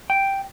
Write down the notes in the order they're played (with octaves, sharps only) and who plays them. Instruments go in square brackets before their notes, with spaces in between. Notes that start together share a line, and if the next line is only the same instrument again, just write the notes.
[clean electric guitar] G5